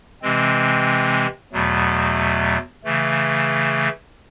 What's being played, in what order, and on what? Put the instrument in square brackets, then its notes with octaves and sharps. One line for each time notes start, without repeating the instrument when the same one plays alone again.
[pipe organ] C3 E3 G#3 C4
E2 B2 F#3 A3
C#3 E3 A3